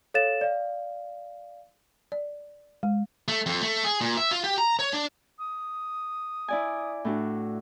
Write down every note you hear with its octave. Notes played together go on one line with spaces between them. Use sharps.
A4 C#5 F5 A6 E7
D5 F5
D5
G#3
A3
F2
A3
G#4
A#2
E5
F4
G4
A#5
C#5
D4
D#6
E4 D5 G#5
A2 D4 F#4